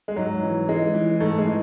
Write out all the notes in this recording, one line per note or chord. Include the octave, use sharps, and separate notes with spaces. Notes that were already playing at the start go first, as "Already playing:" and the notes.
G#3
G#2 F#3
E3
E3 G#3
E3
G#2 A3
G#3
E3